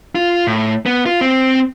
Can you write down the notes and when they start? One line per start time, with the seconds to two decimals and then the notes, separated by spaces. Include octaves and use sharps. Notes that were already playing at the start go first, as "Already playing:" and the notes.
0.15 F4
0.47 A2
0.86 B3
1.06 F4
1.21 C4